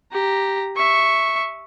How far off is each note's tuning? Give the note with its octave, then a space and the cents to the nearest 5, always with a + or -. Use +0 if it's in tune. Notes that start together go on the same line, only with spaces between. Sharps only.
G4 +0 A#5 +0
E5 +0 C#6 +0